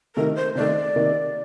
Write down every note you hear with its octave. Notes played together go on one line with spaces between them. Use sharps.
C3 D#3 A3 A#4
C5
C3 D#3 A3 D5
C3 D#3 A#3